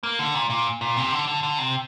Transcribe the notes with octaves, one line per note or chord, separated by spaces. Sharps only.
A#3
D3
A#2
A#2
A#2
C3
D3
D3
D3
C3